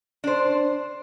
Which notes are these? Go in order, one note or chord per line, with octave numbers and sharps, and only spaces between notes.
D4 C5